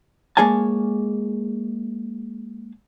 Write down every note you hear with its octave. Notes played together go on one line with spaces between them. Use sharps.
G#3 A#3 G#4 C#5 G#5 A5